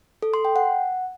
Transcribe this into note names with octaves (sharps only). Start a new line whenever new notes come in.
A4
C6
G5
F#5